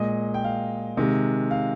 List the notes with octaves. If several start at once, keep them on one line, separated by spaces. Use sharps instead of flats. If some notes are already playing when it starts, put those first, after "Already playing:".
Already playing: A#2 G#3 D#5
G5
F5
C3 D#3 G#3
F5